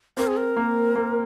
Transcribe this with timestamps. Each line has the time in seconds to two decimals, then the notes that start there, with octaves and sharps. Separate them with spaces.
0.17 C4 A#4
0.27 G#4
0.37 A#4
0.56 A#3
0.96 A#3